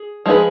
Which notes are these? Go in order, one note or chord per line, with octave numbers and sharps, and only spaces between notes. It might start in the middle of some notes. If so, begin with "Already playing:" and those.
Already playing: G#4
F3 G#3 D#4 G#4 B4